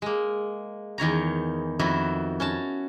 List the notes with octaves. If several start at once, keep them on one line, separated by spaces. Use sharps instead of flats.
G#3 A#3
E2 D#3 C#5 A#5
F2 D#3 E4 F#4 B4 E5
C#4 F#4 A5